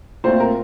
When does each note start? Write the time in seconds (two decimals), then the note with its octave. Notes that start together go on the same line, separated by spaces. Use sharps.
0.24 A#2 A3 C4 F4 C5
0.40 A#4